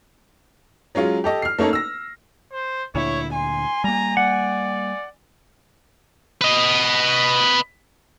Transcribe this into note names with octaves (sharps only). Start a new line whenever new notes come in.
F#3 G#3 C#4 F4
G4 A4 D#5
F6 C7
A3 A#3 C#4 D#4 A4
E6 A#6
C5
D2 A#2 D3 E4 C#5
G#5 C6
G3 A#3 A#5
D5 F#5
B4 D#5